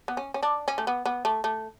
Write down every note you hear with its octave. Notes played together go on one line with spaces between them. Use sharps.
B3
C#4
C#4
D4
C#4
A3
B3
B3
A3
A3